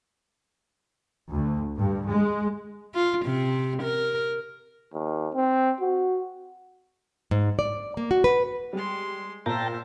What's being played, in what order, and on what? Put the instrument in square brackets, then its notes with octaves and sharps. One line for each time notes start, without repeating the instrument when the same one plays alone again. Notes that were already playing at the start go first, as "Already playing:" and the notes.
[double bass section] D2
G2
G#3
[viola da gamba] F4
C3
A#4
[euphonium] D#2
C4
F#4
[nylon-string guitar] G#2
D5
A#3
F#4
B4
[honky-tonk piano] G3 [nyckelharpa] G#3 C6
[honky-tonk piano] A#2 [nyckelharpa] C5 E5 [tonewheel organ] G5 A5 A#5